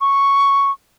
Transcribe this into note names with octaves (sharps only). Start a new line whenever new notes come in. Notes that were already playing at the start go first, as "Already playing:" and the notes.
C#6